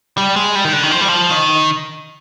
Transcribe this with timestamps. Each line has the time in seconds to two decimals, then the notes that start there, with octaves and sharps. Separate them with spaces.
0.18 G3
0.36 G#3
0.55 G3
0.64 D#3
0.73 D3
0.83 D#3
0.91 F3
1.01 G3
1.08 F3
1.30 D#3